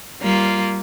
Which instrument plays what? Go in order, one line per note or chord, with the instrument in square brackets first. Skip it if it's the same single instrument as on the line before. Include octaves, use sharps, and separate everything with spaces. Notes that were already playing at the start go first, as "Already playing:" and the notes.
[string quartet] G3 A#3 F4